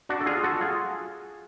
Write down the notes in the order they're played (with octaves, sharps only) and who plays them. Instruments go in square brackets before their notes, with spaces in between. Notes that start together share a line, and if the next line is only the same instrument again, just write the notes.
[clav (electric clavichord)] D4 F#4
A4
F4 G#4
F#4 A4
F4 G#4